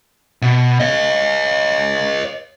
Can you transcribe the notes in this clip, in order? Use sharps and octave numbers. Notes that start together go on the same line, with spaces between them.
B2
C#5 D#5